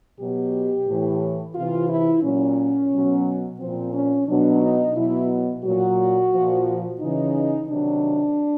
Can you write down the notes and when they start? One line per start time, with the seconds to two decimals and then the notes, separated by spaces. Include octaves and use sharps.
0.19 B2 F#3 G4
0.88 A2 E3
1.55 C3 E3 F4
1.89 E4
2.23 A#2 F#3 C#4
2.91 B2 F#3
3.60 A#2 F3 C4
3.94 C#4
4.28 B2 F#3 D4
4.62 D#4
4.97 B2 F#3 E4
5.65 A#2 F#3 F#4
6.33 A#2 F3
7.01 C#3 E3 D#4
7.69 C3 D#3 F#3 D4